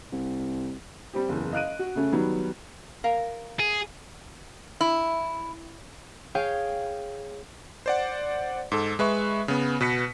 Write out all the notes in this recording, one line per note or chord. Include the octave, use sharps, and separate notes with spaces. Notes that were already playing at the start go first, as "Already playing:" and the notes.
C2
G3 C4 G4
F#1 E2
D#5 F5 F#6 D7 D#7
F#4
C#3 A3 C#4
D#3 F#3 G3 B3
A#4 F5
G#4
E4
G#4 C#5 F5 G5
C5 D5 F#5
G#2 A4
G#3 B4 E5 C#6
C#3 B3
B2 B4 B6 C#7